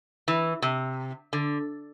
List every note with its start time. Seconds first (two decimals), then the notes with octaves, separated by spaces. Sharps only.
0.28 E3
0.62 C3
1.33 D3